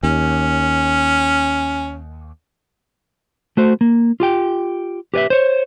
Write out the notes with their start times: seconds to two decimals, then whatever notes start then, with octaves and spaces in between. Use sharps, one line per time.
0.03 D#2 C#4
3.57 A3 F#4 C5
3.81 A#3
4.20 F4 G4 G5
5.14 G4 B4 D5 E5
5.30 C5 C#5